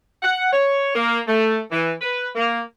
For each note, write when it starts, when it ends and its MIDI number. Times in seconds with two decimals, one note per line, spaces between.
0.23 0.49 78
0.51 0.89 73
0.94 1.19 58
1.27 1.59 57
1.71 1.91 52
2.01 2.28 71
2.35 2.60 58